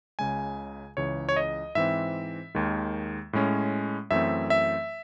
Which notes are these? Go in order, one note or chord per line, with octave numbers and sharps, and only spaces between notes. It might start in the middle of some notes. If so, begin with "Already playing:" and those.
C#2 C#3 G#3 G#5
C#2 C#3 E3 C#5
C#5
D#5
G#2 E3 C4 E5
D#2 D#3 G#3
A2 G#3 C#4
F#2 E3 A3 C4 E5
E5